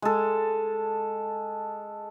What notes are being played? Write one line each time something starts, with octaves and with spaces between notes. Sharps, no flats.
G#3 A4